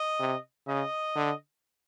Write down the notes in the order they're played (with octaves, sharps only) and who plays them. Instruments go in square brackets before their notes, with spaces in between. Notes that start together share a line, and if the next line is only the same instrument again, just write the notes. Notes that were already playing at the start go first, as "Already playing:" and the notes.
Already playing: [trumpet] D#5
[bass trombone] C3
[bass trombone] C#3 [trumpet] D#5
[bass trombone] D3